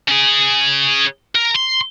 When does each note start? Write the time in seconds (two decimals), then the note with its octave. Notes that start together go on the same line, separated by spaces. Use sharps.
0.08 C#4 G#4
1.35 A#4
1.56 C6